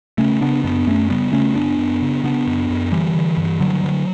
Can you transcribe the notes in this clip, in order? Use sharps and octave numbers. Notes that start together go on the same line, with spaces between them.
C#3 A3 C#4
C#3 B3 D4
F#2 B3 D4
F#2 A3 C#4
C#3 G3 B3
C#3 A3 C#4
F#2 B3 D4
F#2
C#3
C#3 B3 D4
F#2
F#2
D3 E3 G3
D3
G2
G2 D3 F#3
D3